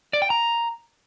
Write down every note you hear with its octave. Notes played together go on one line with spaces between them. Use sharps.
D5
G5
A#5